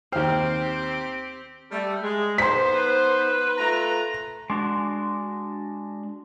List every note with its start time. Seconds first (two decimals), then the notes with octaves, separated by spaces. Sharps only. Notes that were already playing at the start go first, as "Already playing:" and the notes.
0.12 D#2 C4 G4 C5 G5 F6
1.71 G3 A3
2.02 G#3
2.38 B3 D#4 C5 C6 B6
2.74 B4
3.57 A3 F4 A#5
4.50 G#3 D4 F#4